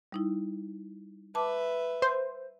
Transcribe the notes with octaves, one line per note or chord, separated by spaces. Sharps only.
G3 D#4 E4
B4 E5 A5 D6
C5